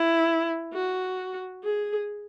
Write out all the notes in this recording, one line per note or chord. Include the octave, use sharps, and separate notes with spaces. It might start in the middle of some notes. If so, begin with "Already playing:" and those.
Already playing: E4
F#4
G#4